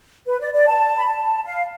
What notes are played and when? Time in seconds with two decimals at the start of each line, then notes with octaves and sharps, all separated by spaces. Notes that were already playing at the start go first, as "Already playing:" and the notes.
0.27 B4
0.41 D5
0.54 D5
0.67 A5
0.97 B5
1.06 A5
1.45 F5